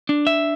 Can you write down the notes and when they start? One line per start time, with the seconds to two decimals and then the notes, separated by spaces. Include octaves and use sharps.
0.09 D4
0.27 E5